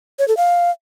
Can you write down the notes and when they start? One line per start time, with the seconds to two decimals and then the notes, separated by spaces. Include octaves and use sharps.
0.19 C#5
0.28 A4
0.37 F5